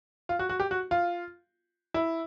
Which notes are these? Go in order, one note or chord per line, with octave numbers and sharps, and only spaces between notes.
F4
F#4
F#4
G4
F#4
F4
E4